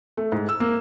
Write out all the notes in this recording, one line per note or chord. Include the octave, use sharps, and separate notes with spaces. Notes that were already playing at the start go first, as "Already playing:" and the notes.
A3
G#2
E6
A#3